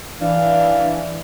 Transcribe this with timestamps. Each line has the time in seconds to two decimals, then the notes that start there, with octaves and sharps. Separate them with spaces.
0.21 E3 D4 F5